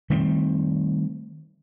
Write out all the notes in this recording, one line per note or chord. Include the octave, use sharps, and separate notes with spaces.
D#3 G3 A3 C4